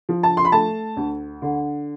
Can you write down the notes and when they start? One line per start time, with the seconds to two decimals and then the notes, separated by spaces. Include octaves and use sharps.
0.09 F3
0.23 A5
0.37 C6
0.45 B5
0.52 A3 A5
0.97 D2
1.42 D3